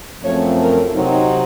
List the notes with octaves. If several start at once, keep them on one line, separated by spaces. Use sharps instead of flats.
F#2 F3 A3 C4 C#5
A#4
C3 F#3 C4 D#4